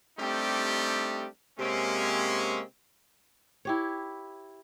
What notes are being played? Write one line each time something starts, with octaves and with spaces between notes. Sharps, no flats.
G3 A3 C4 D4 D#4 G4
C3 G#3 A#3 C4 C#4
E4 G4 C#5